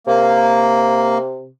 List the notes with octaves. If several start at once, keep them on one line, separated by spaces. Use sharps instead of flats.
C3 A#3